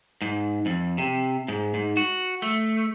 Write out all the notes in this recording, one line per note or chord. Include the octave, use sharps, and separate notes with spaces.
G#2
F2
C3
G#2
G#2
F#4
A3